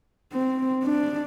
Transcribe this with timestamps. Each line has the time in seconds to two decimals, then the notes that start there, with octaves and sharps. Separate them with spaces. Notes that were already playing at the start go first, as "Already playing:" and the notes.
0.33 C4
0.84 D4